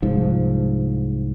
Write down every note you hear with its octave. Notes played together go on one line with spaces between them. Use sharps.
C2 G#2 F3